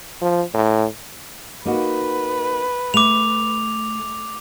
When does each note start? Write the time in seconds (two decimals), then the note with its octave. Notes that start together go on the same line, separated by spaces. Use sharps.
0.21 F3
0.54 A2
1.65 A#3 D#4 F#4 B4
2.94 A3 D6 F7